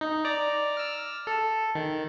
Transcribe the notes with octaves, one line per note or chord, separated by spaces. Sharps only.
D#4
D5 A#5
E6 F6
A4
D#3